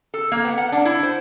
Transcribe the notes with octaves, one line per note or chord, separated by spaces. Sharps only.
A4
A#3
B3
F#5
D4
E4
C5